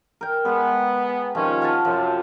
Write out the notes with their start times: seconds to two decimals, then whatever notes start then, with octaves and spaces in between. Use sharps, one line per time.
0.21 A#4 G5
0.45 G#3 B3
1.35 C3 D#3 F3 C#4
1.62 F5 F#5 A5
1.85 F#2 C3 F3